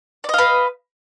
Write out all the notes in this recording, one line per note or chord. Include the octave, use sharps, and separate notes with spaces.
B4 D5 D#5 F5